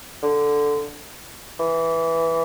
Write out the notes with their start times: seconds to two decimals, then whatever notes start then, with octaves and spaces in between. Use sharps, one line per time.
0.23 D3
1.59 E3